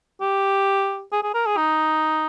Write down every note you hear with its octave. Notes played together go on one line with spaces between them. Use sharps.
G4
G#4
G#4
A#4
G#4
D#4